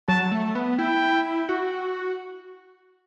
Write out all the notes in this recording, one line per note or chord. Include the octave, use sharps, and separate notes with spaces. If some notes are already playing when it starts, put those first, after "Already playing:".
F#3 A5
A3
B3
E4 G5
F#4